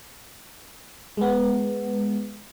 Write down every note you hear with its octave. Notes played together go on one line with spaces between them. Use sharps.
G#3 B3